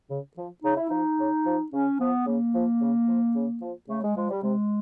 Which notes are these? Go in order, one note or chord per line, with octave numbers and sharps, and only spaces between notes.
C#3
F3
C#3 D#4
E4
F3 D#4
C#3
F3
C#3 C#4
F3 B3
C#3 A#3
F3
C#3
F3
C#3
F3
C#3 A3
G#3
F3 G#3
G3
C3 G#3